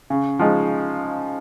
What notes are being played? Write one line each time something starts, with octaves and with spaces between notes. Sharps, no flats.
C#3
F3 G#3 D#4